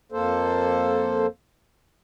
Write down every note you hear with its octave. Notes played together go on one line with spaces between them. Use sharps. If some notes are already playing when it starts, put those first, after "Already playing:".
F2 A#3 A4 C5